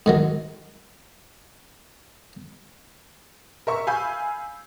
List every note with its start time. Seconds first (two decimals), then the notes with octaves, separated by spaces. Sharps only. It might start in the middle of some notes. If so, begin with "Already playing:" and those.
0.06 G#2 D#3 F#3
3.67 A#4 E5 C#6
3.87 F5 G#5 B5 E6 G6